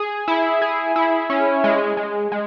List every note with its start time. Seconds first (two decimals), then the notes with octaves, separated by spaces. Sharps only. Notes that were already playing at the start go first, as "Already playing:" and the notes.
Already playing: G#4
0.28 E4
0.62 G#4
0.96 E4
1.30 C#4
1.64 G#3
1.97 G#3
2.32 G#3